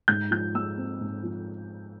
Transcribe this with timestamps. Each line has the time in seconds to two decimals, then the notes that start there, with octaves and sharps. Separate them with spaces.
0.08 G#2 G6
0.31 F3 G6
0.55 G#3 E6
0.77 C4
1.01 G#2
1.23 F3